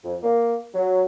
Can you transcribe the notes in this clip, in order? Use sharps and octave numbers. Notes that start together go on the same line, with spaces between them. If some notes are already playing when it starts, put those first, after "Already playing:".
F2
A#3
F#3